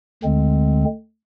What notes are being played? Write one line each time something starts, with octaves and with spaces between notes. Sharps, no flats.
D2 D3 G#3 C4